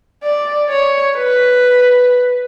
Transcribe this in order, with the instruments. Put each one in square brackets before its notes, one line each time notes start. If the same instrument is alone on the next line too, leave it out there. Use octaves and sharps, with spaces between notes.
[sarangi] D5
C#5
B4